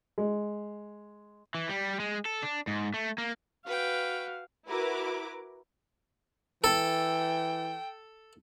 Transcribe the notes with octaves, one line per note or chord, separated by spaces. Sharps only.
G#3
E3
G3
G#3
A4
D4
G#2
A3
A#3
F#4 B4 F5 G5
E4 F#4 A#4 B4 D6
E3 A4 G5